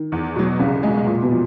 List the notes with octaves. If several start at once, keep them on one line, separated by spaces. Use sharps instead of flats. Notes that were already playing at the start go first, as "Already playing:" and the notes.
Already playing: D#3
E2
B2 F#3
C2 C#3
B2 G#3
A#2
B2
F3